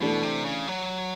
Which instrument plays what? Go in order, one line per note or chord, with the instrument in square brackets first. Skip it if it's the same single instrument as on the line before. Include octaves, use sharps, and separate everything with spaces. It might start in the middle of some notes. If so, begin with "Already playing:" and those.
[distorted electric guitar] B2 [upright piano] E3 A3 D4
[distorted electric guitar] C3
C#3
F#3